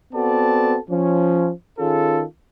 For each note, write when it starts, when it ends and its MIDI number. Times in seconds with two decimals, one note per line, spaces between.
0.14 0.77 59
0.14 0.77 60
0.14 0.77 66
0.14 0.77 69
0.14 0.77 74
0.14 0.77 81
0.89 1.49 53
0.89 1.49 61
1.78 2.23 51
1.78 2.23 61
1.78 2.23 65
1.78 2.23 68
1.78 2.23 69